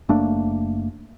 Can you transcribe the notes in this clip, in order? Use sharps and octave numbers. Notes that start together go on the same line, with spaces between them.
F#1 A3 A#3 D4